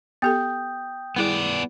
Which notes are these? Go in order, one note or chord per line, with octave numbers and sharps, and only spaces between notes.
B3 G4 A4 G5 D#6 G6
G3 B3 E4 G#4 D5